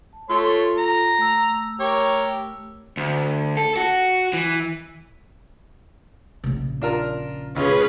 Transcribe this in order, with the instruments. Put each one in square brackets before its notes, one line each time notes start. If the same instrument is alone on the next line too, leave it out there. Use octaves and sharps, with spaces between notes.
[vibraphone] A5
[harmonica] A3 C#5 C6 [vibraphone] F4 A4
[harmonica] A#5
[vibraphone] A3 E6
[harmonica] G4 A#4 C#5
[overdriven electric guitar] D2
A4
F#4
E3
[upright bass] A#1 C#3
[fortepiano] D4 F4 A#4
[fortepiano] C#2 F4 [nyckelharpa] C#4 G#4 [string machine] B4